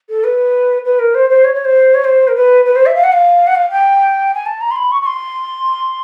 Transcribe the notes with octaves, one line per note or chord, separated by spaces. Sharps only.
A4
B4
B4
A#4
C5
C5
C#5
C#5
C5
C#5
C5
A#4
B4
B4
C5
E5
F5
F#5
F5
F#5
F5
G5
G#5
A5
A#5
C6
B5
C#6
C#6
C6